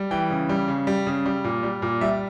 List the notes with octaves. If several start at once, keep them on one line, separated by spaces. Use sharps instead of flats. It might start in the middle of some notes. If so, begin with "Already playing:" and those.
Already playing: G3
E3 G5
C#3
G3
C#3
G3
C#3
G3
A#2
G3
A#2
G3 E5